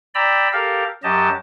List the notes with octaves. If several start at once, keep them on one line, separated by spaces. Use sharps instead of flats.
D5 G5 A#5 B5 E6
G4 A4 A#4 F5
F#2 F#3 G4 D#5 A5